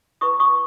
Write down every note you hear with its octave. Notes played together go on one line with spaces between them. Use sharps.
E4 G#4 B4 C#6 D#6
C#6 D#6